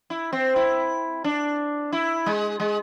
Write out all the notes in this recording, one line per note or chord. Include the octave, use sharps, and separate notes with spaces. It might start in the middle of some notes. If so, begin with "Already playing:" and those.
E4
C4
E4
D4
E4
G#3
G#3